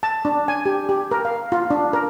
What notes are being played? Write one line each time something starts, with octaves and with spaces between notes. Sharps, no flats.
A5
D4
G#5
G4
G4
A#4
F5
F4
D4
A#4